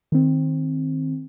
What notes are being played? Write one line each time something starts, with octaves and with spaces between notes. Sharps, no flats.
D#3 C4